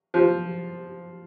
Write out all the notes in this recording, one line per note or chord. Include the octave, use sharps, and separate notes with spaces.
F3